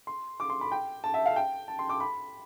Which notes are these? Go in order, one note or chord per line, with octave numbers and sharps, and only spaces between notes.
C6
D6
C6
B5
G5
A5
E5
F5
G5
A5
C6
D6
B5